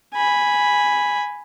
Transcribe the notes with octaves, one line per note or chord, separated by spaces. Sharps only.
G#5 B5